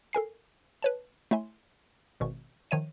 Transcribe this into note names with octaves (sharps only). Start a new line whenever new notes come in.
A4 A#4 G#5 C7
B4 C#5 A5
A3 E4 C#5 E5 G#5 C6
G#1 B2 C#6
D#3 F3 C#5 E5 D#7